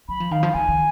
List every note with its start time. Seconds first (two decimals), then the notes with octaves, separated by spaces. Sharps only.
0.09 F#3 B5
0.20 F3
0.31 D#3 F5
0.43 F3
0.54 D#3 G#5
0.68 D#3